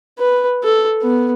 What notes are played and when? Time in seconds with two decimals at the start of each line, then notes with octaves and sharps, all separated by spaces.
0.19 B4
0.64 A4
1.02 B3